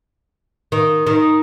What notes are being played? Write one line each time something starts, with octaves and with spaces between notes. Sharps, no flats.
D#3
D#3